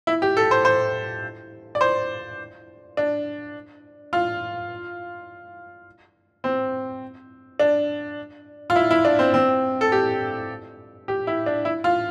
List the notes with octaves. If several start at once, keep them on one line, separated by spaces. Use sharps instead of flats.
E4
G4
A4
C5
C5
D5
C5
D4
F4
C4
D4
F4
E4
E4
D4
C4
C4
A4
G4
G4
E4
D4
E4
F4